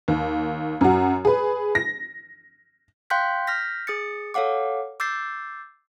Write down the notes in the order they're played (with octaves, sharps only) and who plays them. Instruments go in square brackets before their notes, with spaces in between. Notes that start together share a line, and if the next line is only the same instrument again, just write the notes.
[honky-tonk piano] D#2
F#2 F#4
G#4 B4
A#6
[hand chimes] F5 G5 C6 F#6 G6 B6
F6 G6 A#6 B6
G#4 D#6 A6 C#7
A4 C#5 F5 F#5 D6
D6 E6 G6 A6 C7